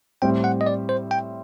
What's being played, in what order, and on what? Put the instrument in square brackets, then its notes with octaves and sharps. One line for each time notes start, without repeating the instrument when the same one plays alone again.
[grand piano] A2 G3 C4 [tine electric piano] G5
[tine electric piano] F#5
D#5
D5
C5
G5